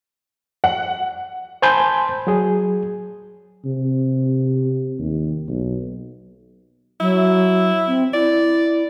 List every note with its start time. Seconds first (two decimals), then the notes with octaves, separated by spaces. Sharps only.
0.64 F#5
1.62 C5 G#5 A5 B5 C6 G6
2.27 F#3 G#4
3.65 C3
4.99 D#2
5.48 B1
7.00 F#3 E4
7.88 C4
8.14 E4 D5